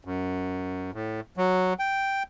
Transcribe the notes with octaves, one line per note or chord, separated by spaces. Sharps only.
F#2
A2
F#3
G5